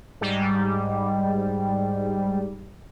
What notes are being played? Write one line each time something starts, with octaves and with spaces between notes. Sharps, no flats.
G#2 G3